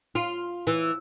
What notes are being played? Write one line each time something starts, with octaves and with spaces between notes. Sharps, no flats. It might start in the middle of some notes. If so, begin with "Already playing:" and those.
F4
E3